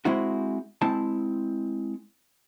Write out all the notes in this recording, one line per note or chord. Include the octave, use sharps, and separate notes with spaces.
G#3 C4 E4 F#4
G#3 C4 E4 A5